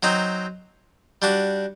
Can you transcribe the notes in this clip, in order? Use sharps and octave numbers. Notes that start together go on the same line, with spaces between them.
F#3 C4 D#4
G3 D4 F#4